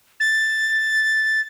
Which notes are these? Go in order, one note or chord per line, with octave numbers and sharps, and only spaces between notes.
A6